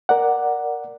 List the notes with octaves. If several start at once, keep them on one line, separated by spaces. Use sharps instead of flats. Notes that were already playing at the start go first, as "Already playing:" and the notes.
A#4 D5 F#5